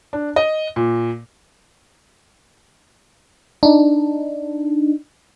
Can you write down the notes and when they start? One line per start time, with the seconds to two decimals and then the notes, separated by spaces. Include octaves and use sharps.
0.13 D4
0.36 D#5
0.76 A#2
3.63 D4 D#4